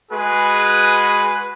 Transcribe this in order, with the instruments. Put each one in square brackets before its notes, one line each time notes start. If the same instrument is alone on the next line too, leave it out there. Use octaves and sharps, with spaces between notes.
[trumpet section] G#3 F#4 G#4 B4